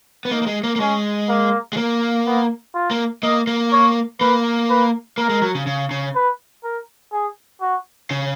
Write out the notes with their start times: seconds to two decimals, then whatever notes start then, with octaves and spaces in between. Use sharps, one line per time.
0.25 B3
0.31 A#3 D#4
0.42 A#3
0.46 G#3
0.64 A#3
0.76 A#3
0.80 G#3 C#4
1.28 A#3
1.73 G#3
1.77 A#3
2.26 B3
2.74 F4
2.91 A#3
3.23 A#3 D#5
3.47 A#3
3.72 C#5
4.20 A#3 B4
4.70 B4
5.18 A#3 A#4
5.29 G#3
5.42 F#3
5.55 C#3
5.67 C#3
5.91 C#3
6.15 B4
6.64 A#4
7.12 G#4
7.61 F#4
8.11 C#3